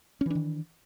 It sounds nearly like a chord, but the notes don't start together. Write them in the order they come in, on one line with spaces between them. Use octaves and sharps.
C#4 E3 D4 D#3